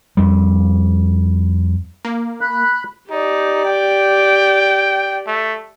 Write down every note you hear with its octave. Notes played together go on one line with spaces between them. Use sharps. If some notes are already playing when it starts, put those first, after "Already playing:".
F2 G3
A#3
B5 F#6
D#4 G4 D5
G5
A3